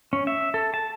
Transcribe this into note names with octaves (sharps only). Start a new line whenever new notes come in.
C#4
E5
A4
A5